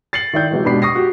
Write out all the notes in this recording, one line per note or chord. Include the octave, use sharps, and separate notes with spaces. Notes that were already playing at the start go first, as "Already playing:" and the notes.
A6 C7 C#7 F#7
D#3 E4 D5 G6
C3 E3 F#3 G#3
G#2 B2 D4 G4 B5 C7
C#6 D#6 A#6 C7
F#4 G4